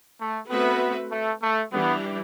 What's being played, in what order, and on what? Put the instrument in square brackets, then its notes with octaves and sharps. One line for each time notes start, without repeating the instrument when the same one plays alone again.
[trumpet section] A3
[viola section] A3 C4 F#4 B4 E5 [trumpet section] B3
[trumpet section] A3
A3
[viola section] E3 G3 D4 G4 [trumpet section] B3